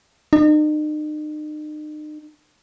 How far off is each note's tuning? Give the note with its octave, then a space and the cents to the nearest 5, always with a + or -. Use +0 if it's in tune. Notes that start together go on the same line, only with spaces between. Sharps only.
D#4 -40